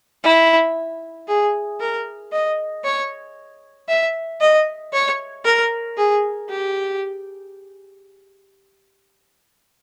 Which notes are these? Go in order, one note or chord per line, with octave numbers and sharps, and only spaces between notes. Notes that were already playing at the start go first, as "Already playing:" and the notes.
E4
G#4
A#4
D#5
C#5
E5
D#5
C#5
A#4
G#4
G4